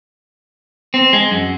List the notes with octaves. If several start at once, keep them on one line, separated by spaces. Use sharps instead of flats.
C4
G#3
F#2